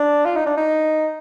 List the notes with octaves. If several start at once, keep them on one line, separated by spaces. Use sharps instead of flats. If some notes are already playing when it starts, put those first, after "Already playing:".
Already playing: D4
F4
D#4
D4
D#4